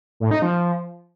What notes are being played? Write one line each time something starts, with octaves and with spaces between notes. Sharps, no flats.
A2
D#4
F3